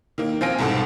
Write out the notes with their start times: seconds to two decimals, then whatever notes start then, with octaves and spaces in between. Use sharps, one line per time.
0.18 D#3 A#3
0.41 F3 C4 F5 G#5 A#6 D7
0.58 C2 G#2 B2 A4 F#5